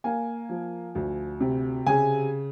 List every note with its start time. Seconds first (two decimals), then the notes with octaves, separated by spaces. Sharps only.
0.04 A#3 G#5
0.49 F3
0.95 D2
1.41 C3
1.86 C#3 G#5